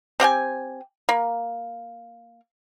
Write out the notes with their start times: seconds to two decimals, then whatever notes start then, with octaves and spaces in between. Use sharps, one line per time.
0.20 C4 G4 F#5 G#5
1.09 A#3